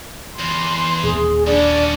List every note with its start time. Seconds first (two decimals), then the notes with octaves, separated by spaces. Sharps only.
0.39 E2 C6
1.04 D#1 G#4
1.47 G2 C#4 D4 D5